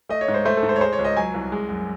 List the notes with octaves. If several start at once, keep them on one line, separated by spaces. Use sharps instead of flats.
A3 D#5
C#5
G#2
C5
A3 C5
A4
G#2
C5
C#5
G#3 C5
C#5
C#2
D#5
F#3 G#5
C2
G#3
F#2